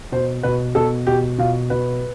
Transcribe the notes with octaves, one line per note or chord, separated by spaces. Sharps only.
B2 C5
B2 B4
B2 A4
B2 G4
B2 F4
B2 B4